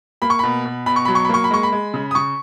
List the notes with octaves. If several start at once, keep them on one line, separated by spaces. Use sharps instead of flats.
A#3 B5
C#6
B2 B5
B2
B2 B5
C#6
F#3 B5
C#6
B5
A#3 C#6
B5
G#3 C#6
B5
G#3
C#3
D#6
C#3 C#6